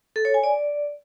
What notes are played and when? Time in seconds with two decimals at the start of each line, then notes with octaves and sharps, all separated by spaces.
0.16 A4
0.25 C#5
0.34 G#5
0.44 D5